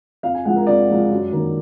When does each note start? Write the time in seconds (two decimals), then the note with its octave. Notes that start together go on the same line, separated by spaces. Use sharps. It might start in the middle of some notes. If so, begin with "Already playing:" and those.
0.23 F2 F5
0.35 G#5
0.45 F3 G#3 F#5
0.56 A#4
0.67 F2 D5
0.89 F3 G#3
1.11 F#2
1.32 D#3 A#3